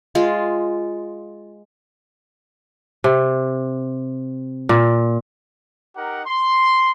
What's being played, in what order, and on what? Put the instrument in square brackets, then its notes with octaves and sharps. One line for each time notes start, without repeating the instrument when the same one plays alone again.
[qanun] G#3 F4
[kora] C3
A#2
[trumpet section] D#4 G4 A#4 F#5
C6